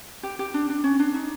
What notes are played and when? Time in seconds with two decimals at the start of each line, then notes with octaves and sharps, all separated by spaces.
0.23 G4
0.39 G4
0.54 D4
0.70 D4
0.84 C#4
0.99 D4
1.14 D#4